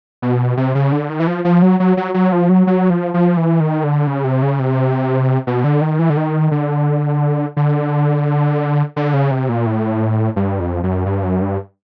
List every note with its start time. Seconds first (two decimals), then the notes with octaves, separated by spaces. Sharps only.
0.22 B2
0.57 C3
0.75 C#3
0.92 D3
1.10 D#3
1.20 E3
1.27 F3
1.45 F3
1.62 F#3
1.80 F#3
1.97 F#3
2.14 F#3
2.32 F3
2.49 F#3
2.67 F#3
2.90 F3
3.14 F3
3.37 E3
3.60 D#3
3.84 D3
4.07 C#3
4.24 C3
4.42 C#3
4.59 C3
5.47 B2
5.64 D3
5.81 D#3
5.99 E3
6.10 D3
6.17 D#3
6.51 D3
7.57 D3
8.96 D3
9.14 C#3
9.31 C3
9.49 A#2
9.66 A2
10.36 G2
10.60 F2
10.83 F#2
11.06 G2
11.23 F#2
11.41 G2